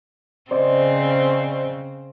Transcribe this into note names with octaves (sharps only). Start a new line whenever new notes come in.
C#3 C4 C5 D5 D#5